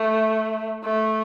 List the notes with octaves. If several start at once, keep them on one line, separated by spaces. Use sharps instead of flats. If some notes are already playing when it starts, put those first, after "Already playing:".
Already playing: A3
A3